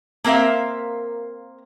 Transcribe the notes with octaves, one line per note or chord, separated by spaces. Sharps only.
A#3 C4 A#4 E5 F5